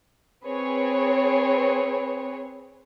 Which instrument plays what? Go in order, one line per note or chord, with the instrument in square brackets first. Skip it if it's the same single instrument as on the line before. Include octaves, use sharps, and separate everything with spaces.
[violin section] C4 G#4 B4 C#5